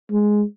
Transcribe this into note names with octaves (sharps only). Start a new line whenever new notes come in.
G#3